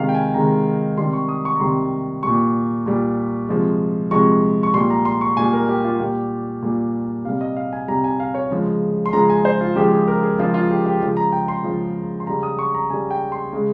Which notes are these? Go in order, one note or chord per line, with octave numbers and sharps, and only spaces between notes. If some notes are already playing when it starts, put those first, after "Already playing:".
Already playing: C3 D#3 G#3 F5
G5
G#5
C3 D#3 G#3 A#5
C3 D#3 G3 C6
C#6
D#6
C#6
A#5
C3 D#3 G3 C6
A#2 G3 C#6
A#2 G3
C3 F3 G#3
C3 F3 G#3 C#6
C#6
A#2 G3 C6
A#5
C6
C#6
A#2 G3 G#5
A#4
G4
F4
A#2 G3 G4
A#2 G3
C3 G3 F5
D#5
F5
G#5
C3 G3 A#5
G#5
F5
C#5
C#3 F3 G#3
C6
C#3 F3 G#3 A#5
G#5
C5
F4
C#3 F3 G#3 G4
G#4
A#4
G#4
C#3 F3 G#3 F4
F4
G4
G4
C#3 F3 G#3
A#5
G5
C6
C#3 F3 G#3
C6
C#3 G3 A#5
D#6
C#6
A#5
C#3 G3 G#5
G5
C6
C#3 G#3